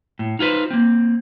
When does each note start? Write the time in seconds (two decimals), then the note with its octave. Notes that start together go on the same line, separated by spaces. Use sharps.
0.19 A2
0.39 D#4 F4 G#4 B4 C5
0.71 A#3 C4